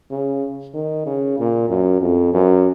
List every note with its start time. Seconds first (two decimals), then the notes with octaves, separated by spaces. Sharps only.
0.11 C#3
0.74 D#3
1.06 C#3
1.38 A#2
1.69 F#2
2.01 F2
2.33 F#2